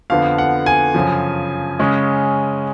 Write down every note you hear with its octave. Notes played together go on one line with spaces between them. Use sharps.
F2 D3 F3 B3 F5
F#5
G#5
F#2 C#3 F3
C#3 G#3 C#4